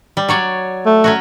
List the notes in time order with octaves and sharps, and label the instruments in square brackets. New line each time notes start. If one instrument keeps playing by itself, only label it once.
[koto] G3
F#3 C#5 D5
[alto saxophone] A3
[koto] F#3 C#4 F#4